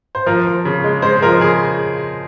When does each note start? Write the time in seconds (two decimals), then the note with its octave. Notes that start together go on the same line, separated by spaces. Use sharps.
0.15 C5
0.26 F3 A#4
0.47 F3
0.65 C#3
0.84 G#3
1.02 G#3 C5
1.22 F3 A#4
1.41 C#3 G#4